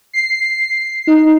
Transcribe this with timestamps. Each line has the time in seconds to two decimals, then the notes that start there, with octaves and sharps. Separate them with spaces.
0.13 C7
1.07 D#4